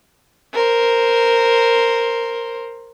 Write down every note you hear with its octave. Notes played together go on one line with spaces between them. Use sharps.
A#4 C5